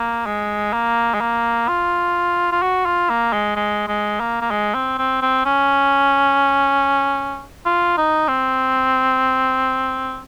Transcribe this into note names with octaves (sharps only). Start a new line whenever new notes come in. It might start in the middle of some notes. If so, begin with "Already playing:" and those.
Already playing: A#3
G#3
A#3
G#3
A#3
F4
F4
F#4
F4
A#3
G#3
G#3
G#3
A#3
A#3
G#3
C4
C4
C4
C#4
F4
D#4
C4